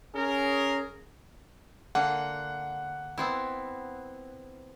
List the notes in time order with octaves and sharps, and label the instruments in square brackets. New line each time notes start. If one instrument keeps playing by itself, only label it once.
[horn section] C#4 G#4 A#4
[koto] D3 A#3 [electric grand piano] F#5
[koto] B3 C4 E4